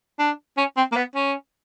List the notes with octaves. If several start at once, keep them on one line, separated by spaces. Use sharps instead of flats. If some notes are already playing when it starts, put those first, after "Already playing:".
D4
C#4
C4
A#3
B3
C#4